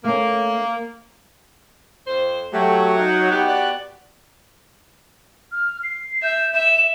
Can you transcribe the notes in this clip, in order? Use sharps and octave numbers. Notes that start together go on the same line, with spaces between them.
A3 A#3 C#4
F2 C5
F#3 A3 G4
D#4 F#5
B3 F#4 G4
D5 F#6
F6
C7
E5 G6
E5 E7